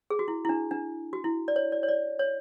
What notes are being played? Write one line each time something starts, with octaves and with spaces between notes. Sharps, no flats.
G#4
F#4
E4
E4
D4
D4
F#4
E4
D5
C#5
D5
C#5
D5
C#5